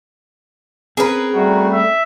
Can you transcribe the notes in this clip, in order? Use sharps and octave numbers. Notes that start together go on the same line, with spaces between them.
C4 C#4 G#4 A#4 B4
G3 A3 F#4
E5